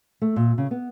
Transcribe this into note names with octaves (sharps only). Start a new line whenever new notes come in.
A3
A#2
C#3
B3